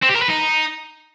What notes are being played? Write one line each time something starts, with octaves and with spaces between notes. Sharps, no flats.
C4
G4
A#4
B4
D#4